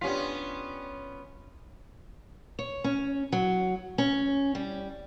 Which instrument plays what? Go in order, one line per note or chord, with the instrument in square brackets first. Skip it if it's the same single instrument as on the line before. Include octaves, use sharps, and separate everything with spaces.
[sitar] B3 C#4 F4 [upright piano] D4 G4 B6
[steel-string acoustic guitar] C#5
C#4
F#3
C#4
G3